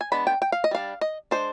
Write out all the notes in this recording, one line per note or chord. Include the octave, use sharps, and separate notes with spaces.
G#5
G#3 B3 D4 B5
G5
G5
F5
D#5
G3 D4 F5
D#5
G#3 D4 C5